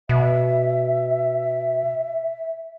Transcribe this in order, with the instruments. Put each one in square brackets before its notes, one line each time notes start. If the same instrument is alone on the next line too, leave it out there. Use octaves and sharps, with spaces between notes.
[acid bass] B2 [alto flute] E5